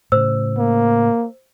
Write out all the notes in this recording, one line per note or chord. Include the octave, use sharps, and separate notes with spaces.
A2 C#3 C5 E6
A#3